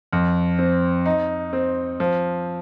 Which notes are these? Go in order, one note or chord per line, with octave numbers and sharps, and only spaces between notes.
F2
C4
D#4
C4
F3